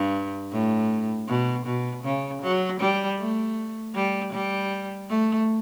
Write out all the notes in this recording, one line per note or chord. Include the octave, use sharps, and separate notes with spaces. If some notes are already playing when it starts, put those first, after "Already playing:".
Already playing: G2
A2
B2
B2
C#3
F#3
G3
A3
G3
G3
A3